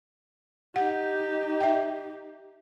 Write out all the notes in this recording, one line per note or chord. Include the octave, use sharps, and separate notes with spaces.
D#4 G4 F#5
E5 G5